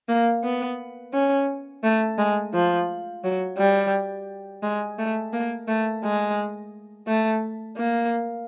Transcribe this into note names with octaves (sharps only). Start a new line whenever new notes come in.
A#3
B3
C#4
A3
G#3
F3
F#3
G3
G#3
A3
A#3
A3
G#3
A3
A#3